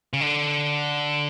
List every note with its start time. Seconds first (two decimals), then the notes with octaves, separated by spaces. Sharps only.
0.13 C#3
0.21 D3